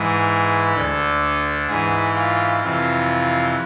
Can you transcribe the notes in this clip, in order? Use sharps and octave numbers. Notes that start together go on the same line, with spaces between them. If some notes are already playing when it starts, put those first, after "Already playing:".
Already playing: G#2 E3 G#4
D2 D3 A4
G#2 E3 G#4
F4
F2 C3 E3 F4